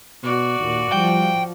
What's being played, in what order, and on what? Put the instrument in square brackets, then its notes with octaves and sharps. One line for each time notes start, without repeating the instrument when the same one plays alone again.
[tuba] B2 [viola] F#4 D5
[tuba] D#2 [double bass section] A#2
[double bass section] F3 [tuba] G3 [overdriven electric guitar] G5